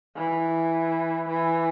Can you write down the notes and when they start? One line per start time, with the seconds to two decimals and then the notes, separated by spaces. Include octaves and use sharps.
0.16 E3
1.29 E3